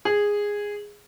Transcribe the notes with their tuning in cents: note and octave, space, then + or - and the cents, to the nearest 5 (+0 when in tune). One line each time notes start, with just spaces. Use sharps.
G#4 -10